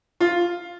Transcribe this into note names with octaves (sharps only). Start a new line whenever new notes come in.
F4